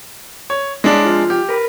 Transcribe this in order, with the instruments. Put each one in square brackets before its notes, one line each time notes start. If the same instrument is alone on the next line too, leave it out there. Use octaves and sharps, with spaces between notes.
[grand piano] C#5
[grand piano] G#3 D4 [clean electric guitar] E4 C#5 D5
[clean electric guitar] C3 F3 F4
[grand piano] G4
[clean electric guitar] A#4 B4